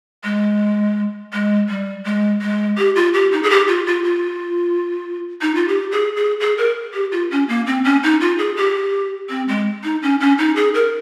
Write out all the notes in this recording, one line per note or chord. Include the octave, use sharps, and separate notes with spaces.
G#3
G#3
G3
G#3
G#3
G4
F4
G4
D#4
G#4
G4
F4
F4
F4
D#4
F4
G4
G#4
G#4
G#4
A#4
G4
F4
C#4
A#3
C4
C#4
D#4
F4
G#4
G4
C4
G#3
D#4
C#4
C#4
D#4
G#4
A#4